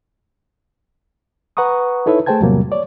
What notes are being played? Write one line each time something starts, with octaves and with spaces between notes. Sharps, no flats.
B4 F#5 A#5 C#6 D#6
D#4 E4 A4 B4 C#5 E5
A3 G#4 C5 G5 A5 G#6
E2 A2 C3 F#3 G3 A#3
C#5 D5